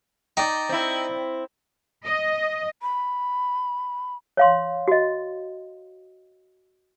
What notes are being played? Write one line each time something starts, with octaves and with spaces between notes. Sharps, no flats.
D#4 D5 G5
C4 E4
D#5
B5
C#5 F5 C6
F#4 D#5